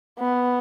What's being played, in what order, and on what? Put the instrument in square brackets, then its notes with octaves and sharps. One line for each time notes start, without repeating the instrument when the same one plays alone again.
[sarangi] B3